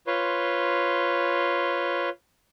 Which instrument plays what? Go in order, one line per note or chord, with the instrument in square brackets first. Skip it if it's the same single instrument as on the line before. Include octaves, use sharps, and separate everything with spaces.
[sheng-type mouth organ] F4 B4 C#5 C6